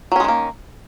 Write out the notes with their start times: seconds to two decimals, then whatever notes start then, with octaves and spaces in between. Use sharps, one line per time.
0.12 F#3
0.16 C#4
0.20 G#3
0.24 D#3
0.28 A#3